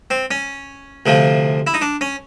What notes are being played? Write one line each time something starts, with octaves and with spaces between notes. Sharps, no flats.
C4
C#4
D2 C3 F3
E4
D#4
D4
C#4